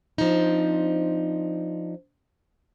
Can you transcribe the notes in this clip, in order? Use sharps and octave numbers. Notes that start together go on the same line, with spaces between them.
F3 C4 D4 D#4